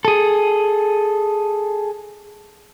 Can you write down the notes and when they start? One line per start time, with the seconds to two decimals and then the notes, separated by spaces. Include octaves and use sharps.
0.05 G#4 A4